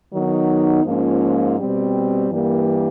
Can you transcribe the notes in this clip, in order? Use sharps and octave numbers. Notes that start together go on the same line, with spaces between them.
D#3 F#3 B3 D#4
G#2 F3 A#3 C#4 F4
B2 G3 C4
G2 E3 G3 A#3